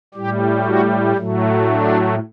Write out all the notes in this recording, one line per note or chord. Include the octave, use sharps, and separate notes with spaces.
A2 G3 G4
F#4
A2 F#3 A3
D4